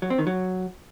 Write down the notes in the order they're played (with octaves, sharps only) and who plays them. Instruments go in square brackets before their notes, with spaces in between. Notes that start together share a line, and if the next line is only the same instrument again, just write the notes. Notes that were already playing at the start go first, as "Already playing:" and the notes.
[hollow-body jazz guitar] F#3
C4
D#3
F#3